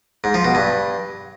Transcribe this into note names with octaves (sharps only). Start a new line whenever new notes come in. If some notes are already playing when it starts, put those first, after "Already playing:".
G#2
F3
B2
G2